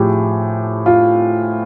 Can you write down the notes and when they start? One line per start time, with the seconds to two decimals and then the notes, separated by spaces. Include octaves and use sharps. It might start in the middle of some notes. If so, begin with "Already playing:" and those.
Already playing: A2 F3 G4 G#4
0.86 F4